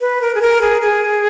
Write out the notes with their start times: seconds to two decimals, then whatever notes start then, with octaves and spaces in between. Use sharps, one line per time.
0.01 B4
0.21 A#4
0.35 G#4
0.41 A#4
0.61 G#4
0.82 G#4